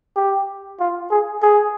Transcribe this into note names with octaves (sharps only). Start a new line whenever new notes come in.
G4
F4
G#4
G#4